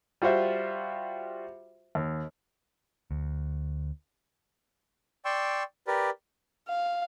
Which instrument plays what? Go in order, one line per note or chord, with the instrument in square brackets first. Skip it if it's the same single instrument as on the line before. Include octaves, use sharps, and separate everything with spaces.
[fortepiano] G3 F4 F#4 C5 E5
D#2
[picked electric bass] D2
[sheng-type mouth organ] D5 G5 C6 C#6 E6
G4 A#4 B4 D5
[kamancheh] F5